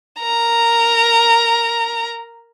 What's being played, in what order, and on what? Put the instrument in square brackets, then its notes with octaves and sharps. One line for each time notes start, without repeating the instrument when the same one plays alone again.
[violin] A#4 A#5